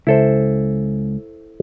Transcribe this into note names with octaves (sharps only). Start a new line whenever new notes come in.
C#2 E4 A4 C5